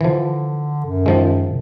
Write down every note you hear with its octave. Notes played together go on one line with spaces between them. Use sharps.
D3 E3 F3
F#2
D#3 F3 G#3